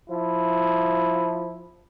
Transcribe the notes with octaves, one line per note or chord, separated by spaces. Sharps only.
F3 E4